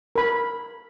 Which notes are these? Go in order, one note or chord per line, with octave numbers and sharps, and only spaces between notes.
A#4 B5